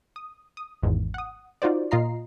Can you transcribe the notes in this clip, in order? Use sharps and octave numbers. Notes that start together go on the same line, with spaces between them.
D#6
D#6
G#1 E2 G#2
F#5 D#6
D#4 F4 F#4 C5 D5
A#2 F4 D#5 A#5 C7